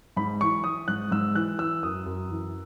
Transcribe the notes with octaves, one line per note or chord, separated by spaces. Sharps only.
G#2 B5
E3 C#6
E3 D#6
G#2 F#6
G#2 E6
E3 F#6
E3 E6
F#2 D#6
F#2
E3